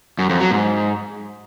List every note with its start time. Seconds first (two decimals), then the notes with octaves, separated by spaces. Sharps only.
0.19 F#2
0.29 F2
0.40 F#3
0.51 G#2